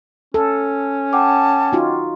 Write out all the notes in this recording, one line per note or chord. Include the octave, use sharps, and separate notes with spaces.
C#4 A4
F#5 G5 A5 D6
D#4 F4 F#4